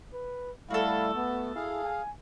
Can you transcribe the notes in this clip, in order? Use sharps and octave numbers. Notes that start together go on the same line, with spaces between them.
B4
G3 A3 E4 F#4 A4 F5
A3 B3
E4 G#4 F5
G#5